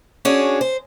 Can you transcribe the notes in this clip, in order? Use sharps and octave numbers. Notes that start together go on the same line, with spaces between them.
C#4 D4 F#4 G#4 C#5
C5